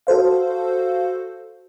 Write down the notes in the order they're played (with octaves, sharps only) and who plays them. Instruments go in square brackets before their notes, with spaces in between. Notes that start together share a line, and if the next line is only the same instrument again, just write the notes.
[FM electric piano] F#4 A4 C5 F5